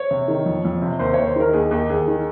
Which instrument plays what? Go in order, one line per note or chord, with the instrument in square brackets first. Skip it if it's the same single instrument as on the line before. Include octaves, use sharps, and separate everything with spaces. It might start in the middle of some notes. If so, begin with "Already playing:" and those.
Already playing: [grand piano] C#5
C3
D#3
F2
F2
C3
D#2 C5
D#2 C#5
C5
D#3 A#4
D#2 G#4
D#2 G4
D#2 G#4
D#3